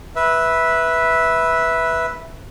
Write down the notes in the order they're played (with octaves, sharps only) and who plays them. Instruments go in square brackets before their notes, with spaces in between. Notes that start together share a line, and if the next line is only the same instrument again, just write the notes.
[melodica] B4 E5